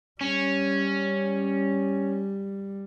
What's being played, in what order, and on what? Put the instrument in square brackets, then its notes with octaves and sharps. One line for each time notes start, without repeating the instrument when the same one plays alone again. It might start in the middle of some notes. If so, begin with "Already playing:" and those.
[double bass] G3 [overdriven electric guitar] C#4